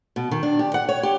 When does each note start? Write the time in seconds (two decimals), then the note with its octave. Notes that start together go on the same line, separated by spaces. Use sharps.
0.16 B2
0.31 D#3
0.43 D4
0.59 G4
0.74 F#5
0.89 C#5
1.03 G4